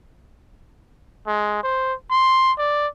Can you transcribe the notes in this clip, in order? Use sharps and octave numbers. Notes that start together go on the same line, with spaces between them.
G#3
C5
C6
D5